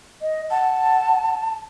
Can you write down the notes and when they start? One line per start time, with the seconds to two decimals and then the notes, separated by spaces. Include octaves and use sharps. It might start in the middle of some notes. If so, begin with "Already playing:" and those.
0.22 D#5
0.51 F#5 A5